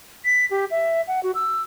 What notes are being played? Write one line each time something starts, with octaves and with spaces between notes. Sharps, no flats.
B6
G4
E5
F#5
F#4
E6